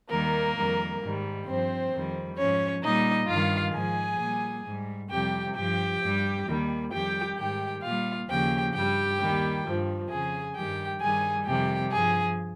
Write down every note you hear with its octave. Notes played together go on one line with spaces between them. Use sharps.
D#2 D#3 G3 A#3 A#4
F2 D#3 G3
G#2 D#3 G3
G2 F3 C4 C5
F2 D#3 G3
G#2 F3 C#4 C#5
A#2 G3 D#4 D#5
G2 D#3 G3 F4 F5
G#2 F3 G#4 G#5
A#2 G3
G#2 G3
F2 C3 G3 G4 G5
G2 F3 G4 G5
G2 G3
D#2 D#3 G3
F2 D#3 G3 G4 G5
G#2 D#3 G3 G4 G5
A#2 G3 F4 F5
D#2 C#3 F3 G4 G5
G2 G3 G4 G5
D#2 D#3 G3
G2 F3
F2 C#3 F3 G#4 G#5
G2 D#3 G3 G4 G5
G2 D#3 G3 G#4 G#5
F2 C3 D#3 G3 G4 G5
G2 F3 G#4 G#5